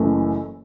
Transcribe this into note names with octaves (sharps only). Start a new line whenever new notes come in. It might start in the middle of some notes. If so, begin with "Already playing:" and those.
Already playing: F#1 F#2 E3 A3